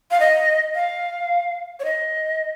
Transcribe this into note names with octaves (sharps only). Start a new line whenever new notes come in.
F5
D#5
F5
C#5
D#5